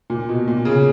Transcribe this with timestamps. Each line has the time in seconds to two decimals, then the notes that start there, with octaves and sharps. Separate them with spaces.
0.10 A#2
0.29 B2
0.48 A#2
0.65 C#3